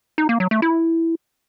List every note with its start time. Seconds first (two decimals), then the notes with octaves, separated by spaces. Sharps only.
0.18 D#4
0.29 A#3
0.40 F#3
0.51 A3
0.62 E4